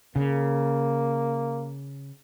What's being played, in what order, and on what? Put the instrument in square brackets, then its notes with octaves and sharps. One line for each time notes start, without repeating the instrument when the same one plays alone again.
[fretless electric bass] C#3 [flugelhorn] A#3